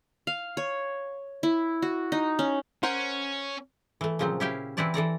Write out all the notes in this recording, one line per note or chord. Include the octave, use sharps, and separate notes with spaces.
F5
C#5
E4
F#4
D#4
C#4
C#4 A#4 C5 F#5
E3 A3
A#2 C#3 F3 F#3 C4
C#4 E4 G4 E5 F5 G5
E3 C4 E4 B4 D5 A5
E3 A4 D5 A#5